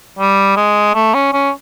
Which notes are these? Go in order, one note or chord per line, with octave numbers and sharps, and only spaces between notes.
G3
G#3
A3
C#4
C#4